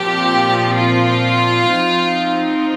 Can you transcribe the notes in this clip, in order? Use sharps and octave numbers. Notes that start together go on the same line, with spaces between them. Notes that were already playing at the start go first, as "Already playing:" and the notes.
Already playing: A#2 F3 C4 G4
F4
F3 C4 D#4